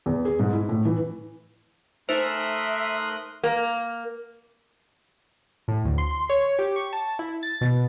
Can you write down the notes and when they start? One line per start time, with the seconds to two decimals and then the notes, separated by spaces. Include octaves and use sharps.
0.06 E2
0.25 G#4
0.39 G#2
0.53 E4
0.69 A2
0.85 E3
2.09 A3 D#4 A#4 C5 E5 C6 D#6 F#6
3.43 A#3
5.68 A2
5.85 D2
5.98 C6
6.11 C6
6.30 C#5
6.59 G4
6.76 C#6
6.93 A5
7.19 E4
7.43 A6
7.61 B2